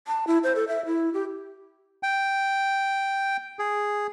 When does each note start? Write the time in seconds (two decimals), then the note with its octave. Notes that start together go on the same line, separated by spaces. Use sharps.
0.07 A5
0.27 E4
0.44 C5
0.55 A4
0.68 E5
0.86 E4
1.14 G4
2.03 G5
3.59 G#4